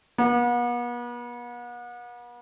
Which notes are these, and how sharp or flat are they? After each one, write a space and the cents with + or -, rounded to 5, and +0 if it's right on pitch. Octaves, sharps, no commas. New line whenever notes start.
B3 -40